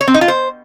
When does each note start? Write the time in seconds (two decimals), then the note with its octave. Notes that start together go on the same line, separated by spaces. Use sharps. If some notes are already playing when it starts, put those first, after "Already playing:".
0.01 C#5
0.08 C4
0.14 D#4
0.21 F4
0.28 C5